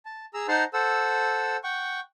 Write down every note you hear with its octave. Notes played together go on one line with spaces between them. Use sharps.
A5
G#4 A#5 E6
D#4 C5 F#5 A5 A#5 C6
A4 C5 F#5 E6
F#5 G5 C#6